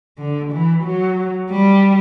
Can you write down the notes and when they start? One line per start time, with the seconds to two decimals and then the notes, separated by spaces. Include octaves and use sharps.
0.19 D3
0.52 E3
0.85 F#3
1.51 G3